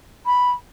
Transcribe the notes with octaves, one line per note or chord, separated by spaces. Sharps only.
B5